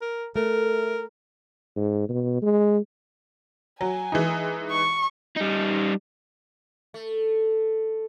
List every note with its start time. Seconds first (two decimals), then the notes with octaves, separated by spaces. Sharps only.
0.02 A#4
0.36 A3 A#4
1.76 G#2
2.09 B2
2.42 G#3
3.81 F#3 G#5
4.12 E3 G#3 D#4
4.71 C#6
5.36 G3 D#4
6.94 A3